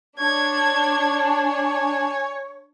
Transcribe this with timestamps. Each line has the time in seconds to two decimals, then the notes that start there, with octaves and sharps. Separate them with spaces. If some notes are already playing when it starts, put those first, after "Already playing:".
0.19 D4 C#5 G#6
1.23 G#5